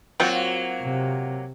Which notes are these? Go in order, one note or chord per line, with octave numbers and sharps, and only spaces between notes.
F#3 A#3 C4 F4 F#4
C3